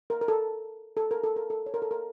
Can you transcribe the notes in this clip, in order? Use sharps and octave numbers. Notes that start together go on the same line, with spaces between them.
A#4
A#4
A4
A4
A#4
A4
A#4
A4
C#5
A#4
A4
A#4